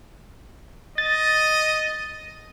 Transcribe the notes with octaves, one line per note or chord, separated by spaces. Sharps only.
D#5 A6